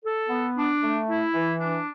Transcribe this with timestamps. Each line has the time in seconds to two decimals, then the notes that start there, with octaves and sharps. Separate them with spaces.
0.04 A4
0.29 B3
0.56 D4
0.82 A3
1.08 E4
1.34 E3
1.59 D4